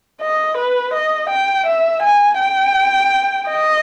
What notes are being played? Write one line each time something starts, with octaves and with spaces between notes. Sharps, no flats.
D#5
B4
D#5
G5
E5
G#5
G5
D#5